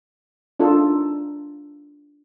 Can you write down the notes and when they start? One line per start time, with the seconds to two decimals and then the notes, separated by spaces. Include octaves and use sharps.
0.60 D4 D#4 F4 A4